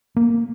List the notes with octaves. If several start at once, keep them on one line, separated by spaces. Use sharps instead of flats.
A#3